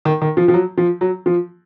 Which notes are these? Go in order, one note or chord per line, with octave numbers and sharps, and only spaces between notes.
D#3
D#3
F3
F3
F#3
F3
F#3
F3